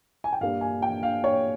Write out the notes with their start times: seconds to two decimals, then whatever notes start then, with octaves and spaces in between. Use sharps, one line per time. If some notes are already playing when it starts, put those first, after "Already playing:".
0.24 G#5
0.33 G5
0.41 G2 G3 A#3 F5
0.61 G#5
0.82 G5
1.03 F5
1.24 C#5